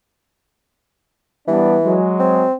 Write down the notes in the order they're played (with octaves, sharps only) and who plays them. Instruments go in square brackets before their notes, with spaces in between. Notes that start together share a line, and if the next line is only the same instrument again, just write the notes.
[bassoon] E3 [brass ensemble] G3 B3 D4
[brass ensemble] F#3 G#3
[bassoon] C4